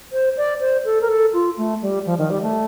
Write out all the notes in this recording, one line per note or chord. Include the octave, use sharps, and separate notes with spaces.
C5
D5
C5
A4
A#4
A4
F4
A3
G3
F3
D#3
G3
A3